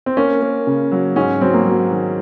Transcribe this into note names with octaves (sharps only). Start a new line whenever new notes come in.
C4
A#3 C#4
A#3
C#3
F#3
G#2 C#4
F#3 C4
A#3
F#3
D#3